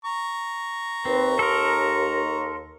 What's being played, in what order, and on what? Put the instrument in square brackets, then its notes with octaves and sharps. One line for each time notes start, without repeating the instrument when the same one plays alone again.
[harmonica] A#5 C#6
[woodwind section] D#2 [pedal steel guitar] C4 [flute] B4
[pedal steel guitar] A4 A#4 [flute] C6